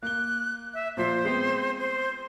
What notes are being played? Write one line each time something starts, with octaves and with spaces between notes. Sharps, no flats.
A#3 F#6 G7
E5
A#2 F3 C5 B6
G#3 B3 C4
C5